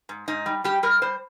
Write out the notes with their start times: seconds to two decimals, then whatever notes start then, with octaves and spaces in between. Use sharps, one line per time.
0.09 G#2
0.28 G#2 D#4
0.46 G3
0.64 G3 G4
0.83 G3 A#4
1.02 G3 C5